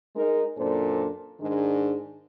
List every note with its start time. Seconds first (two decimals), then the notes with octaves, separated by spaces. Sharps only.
0.15 G#3 D#4 A#4
0.57 F#2 A#2 D4 A4 C5
1.40 G#2 D#3 G#3 D4